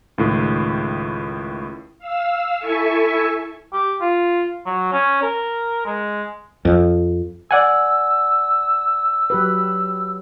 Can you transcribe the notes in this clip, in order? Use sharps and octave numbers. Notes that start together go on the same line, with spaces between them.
C#2 A2 D#3
F5 E6
E4 A4 E5 G#5 C#6
G4
F4
F#3
C#4
A#4
G#3
F2
D5 F#5 G#5 E6
F#3 G4 B4